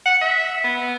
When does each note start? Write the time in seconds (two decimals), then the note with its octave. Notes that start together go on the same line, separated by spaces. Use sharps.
0.06 F#5
0.22 E5
0.64 B3